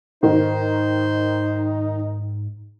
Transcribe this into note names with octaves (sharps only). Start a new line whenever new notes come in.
G#2 D#3 D#4 C5